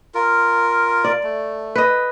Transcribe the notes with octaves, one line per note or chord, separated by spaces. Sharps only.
F4 A#4
D5
A3
B4 D#5